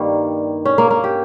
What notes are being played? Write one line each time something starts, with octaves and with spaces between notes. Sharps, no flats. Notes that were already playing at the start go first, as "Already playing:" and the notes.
Already playing: G2 D#3 G3 A#3
C#4
A#3
A#3
G4